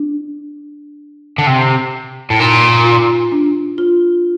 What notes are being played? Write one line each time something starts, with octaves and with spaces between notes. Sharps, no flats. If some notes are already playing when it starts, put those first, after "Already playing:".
Already playing: D4
D3
C3
A2
A#2 D#4
F4
D4
F4